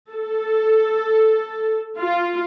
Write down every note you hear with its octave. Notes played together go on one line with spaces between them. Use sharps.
A4
F4